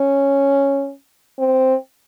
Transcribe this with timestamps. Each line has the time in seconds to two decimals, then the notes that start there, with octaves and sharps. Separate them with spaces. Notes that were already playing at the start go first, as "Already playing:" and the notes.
Already playing: C#4
1.38 C4